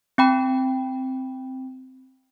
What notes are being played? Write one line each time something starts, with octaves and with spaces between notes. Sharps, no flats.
C4 G5 B5